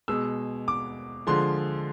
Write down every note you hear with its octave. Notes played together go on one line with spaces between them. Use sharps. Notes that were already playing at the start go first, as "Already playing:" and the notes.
B2 G#3 E6
D6
D3 F3 G#3 C6